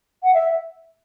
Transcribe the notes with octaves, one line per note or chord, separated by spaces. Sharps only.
F#5
E5